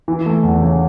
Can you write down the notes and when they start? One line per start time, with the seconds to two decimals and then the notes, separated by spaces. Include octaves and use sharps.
0.08 E3
0.26 A3
0.44 E2
0.62 C#3